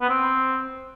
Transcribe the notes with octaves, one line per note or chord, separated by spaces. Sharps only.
B3
C4